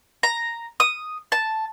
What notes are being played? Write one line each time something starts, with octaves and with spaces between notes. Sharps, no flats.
A#5
D#6
A5